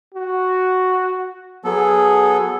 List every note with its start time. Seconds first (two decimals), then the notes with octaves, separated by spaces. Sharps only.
0.14 F#4
1.65 F#3 B3 G#4 A4